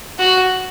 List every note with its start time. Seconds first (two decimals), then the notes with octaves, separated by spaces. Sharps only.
0.19 F#4